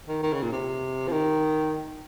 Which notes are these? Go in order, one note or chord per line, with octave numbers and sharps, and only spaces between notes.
D#3
D#3
C#3
A#2
C3
F3
D#3